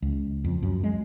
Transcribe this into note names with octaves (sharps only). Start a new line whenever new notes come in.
C#2
F2
F#2
G#3